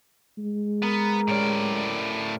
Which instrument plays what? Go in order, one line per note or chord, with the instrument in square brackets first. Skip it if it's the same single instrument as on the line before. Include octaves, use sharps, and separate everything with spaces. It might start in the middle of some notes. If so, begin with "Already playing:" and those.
[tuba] G#3
[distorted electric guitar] B3 [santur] A#4
[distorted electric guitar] A2 D5 [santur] G3 C#4 C5